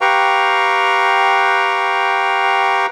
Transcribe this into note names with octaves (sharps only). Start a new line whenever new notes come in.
G4 B4 F5 G5 A#5 C#6